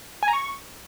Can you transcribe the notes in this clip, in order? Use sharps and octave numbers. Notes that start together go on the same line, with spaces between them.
G#5
A#5
C#6